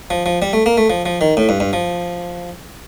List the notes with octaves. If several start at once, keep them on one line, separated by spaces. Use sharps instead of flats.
F3
F3
G3
A3
A#3
A3
F3
F3
D#3
A2
G2
G2
F3